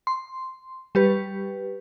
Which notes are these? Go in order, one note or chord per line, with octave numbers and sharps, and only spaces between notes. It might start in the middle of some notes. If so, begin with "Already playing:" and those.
C6
G3 G4 B4